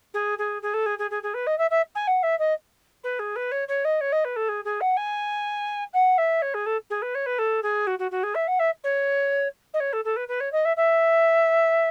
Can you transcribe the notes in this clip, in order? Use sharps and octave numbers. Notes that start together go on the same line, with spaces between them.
G#4
G#4
G#4
A4
G#4
G#4
G#4
G#4
B4
D#5
E5
E5
G#5
F#5
E5
D#5
B4
G#4
B4
C#5
C#5
D#5
C#5
D#5
B4
A4
G#4
G#4
F#5
G#5
F#5
E5
C#5
G#4
A4
G#4
B4
C#5
B4
A4
G#4
F#4
F#4
F#4
G#4
E5
F#5
E5
C#5
D#5
C#5
A4
A4
B4
B4
C#5
D#5
E5
E5